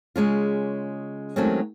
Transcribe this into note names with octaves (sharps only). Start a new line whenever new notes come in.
C#3 G#3 C#4 F4
D#3 F#3 G#3 A3 C4 C#4